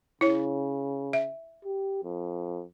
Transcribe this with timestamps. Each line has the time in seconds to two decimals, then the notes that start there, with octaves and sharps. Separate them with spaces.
0.21 C#3 E4 C#5
1.13 E5
1.65 G4
2.04 F2